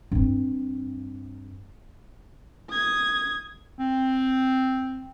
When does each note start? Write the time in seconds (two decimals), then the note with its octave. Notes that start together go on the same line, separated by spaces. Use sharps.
0.12 G2 C4
2.70 D#6 G#6
3.79 C4